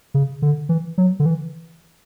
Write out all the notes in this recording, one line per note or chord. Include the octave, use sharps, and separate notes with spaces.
C#3
D3
E3
F#3
D3
E3